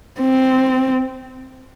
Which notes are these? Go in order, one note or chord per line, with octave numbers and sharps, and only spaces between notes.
C4